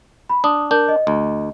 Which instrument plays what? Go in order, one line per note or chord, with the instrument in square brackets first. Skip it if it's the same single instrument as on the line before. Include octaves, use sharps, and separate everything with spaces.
[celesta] B5
[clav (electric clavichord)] D4 [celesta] D#6
[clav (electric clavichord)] D4 [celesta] A#4 G6
[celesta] D#5
[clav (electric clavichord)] D2